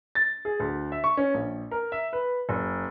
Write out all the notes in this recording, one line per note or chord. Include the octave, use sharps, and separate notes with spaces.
A6
G#4
D2
E5
C#6
C#4
A#1
A#4
E5
B4
F#1